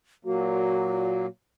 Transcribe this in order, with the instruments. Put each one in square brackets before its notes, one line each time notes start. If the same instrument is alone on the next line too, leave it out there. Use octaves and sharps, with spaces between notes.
[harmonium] A#2 F#3 A#3 [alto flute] F#4